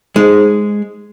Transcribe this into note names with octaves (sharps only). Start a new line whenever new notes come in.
G#3 D#4 G#4 C5 D#5